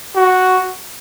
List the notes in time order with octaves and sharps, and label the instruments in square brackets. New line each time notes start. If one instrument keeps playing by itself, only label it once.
[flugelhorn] F#4